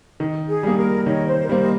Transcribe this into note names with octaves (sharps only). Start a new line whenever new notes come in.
D#3
G#4
G3 A#3
A#4
D#3 A#4 C#5
C5
A#4
G3 A#3 C5
D#5